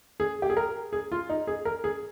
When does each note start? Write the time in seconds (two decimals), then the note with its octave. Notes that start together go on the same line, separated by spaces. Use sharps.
0.20 G#4
0.42 G4
0.50 G#4
0.57 A#4
0.93 G#4
1.12 F4
1.29 D#4
1.47 G#4
1.65 A#4
1.84 G#4